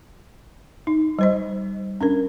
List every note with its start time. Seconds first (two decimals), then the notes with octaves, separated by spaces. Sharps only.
0.87 D#4
1.19 G3 C5 D#5
2.01 C#4 D4 A#4